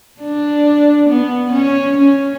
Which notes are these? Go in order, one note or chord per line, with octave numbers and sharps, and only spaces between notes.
D4
B3
C#4
C#4